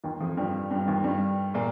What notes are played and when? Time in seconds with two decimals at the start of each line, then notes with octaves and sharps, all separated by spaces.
0.04 D#2 D#3
0.20 F2 F3
0.37 G2 G3
0.71 G2 G3
0.87 D#2 D#3
1.04 G2 G3
1.54 A#2 A#3